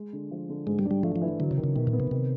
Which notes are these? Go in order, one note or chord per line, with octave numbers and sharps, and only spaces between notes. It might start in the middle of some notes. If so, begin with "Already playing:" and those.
Already playing: G#3
D3
F3
D3
G#2 G#3
G3
D4
G3
F3 A3
F3
E3
D3 F#3
C#3
D#3
C#3
B2 D#3
A#2
B3
C3
C3 D#3